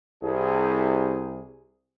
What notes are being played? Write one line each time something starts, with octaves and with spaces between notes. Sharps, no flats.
C2 G#4